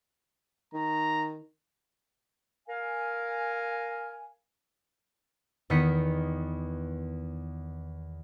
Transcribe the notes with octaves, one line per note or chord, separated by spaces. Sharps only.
D#3 A#5
A#4 F5 G#5
E2 D#3 B3 D#5 B6 C#7